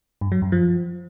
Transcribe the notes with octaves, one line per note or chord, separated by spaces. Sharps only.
G2
F#3
F#2
F3